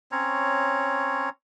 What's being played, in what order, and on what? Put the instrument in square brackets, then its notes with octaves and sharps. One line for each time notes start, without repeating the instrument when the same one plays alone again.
[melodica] C4 C#4 C#5 A#5